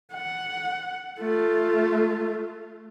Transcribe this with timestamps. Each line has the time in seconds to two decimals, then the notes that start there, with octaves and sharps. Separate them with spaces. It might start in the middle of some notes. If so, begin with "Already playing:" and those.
0.13 F#5
1.19 A3 F4